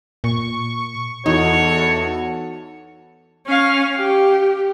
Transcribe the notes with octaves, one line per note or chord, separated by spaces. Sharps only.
A#2 C#6
E2 D#4 F#4 A4 C#5
C#4 F5
G4